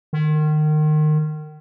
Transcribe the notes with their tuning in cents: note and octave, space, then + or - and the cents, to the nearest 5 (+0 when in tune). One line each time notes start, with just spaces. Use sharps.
D#3 -30